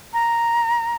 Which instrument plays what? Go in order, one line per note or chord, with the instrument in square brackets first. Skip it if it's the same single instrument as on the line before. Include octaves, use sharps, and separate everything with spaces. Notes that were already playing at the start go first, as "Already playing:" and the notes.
[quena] A#5